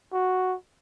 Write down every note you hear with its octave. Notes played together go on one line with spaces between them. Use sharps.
F#4